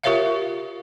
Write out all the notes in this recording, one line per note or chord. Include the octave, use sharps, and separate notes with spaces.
F4 G4 A#4 C#5 E5 F5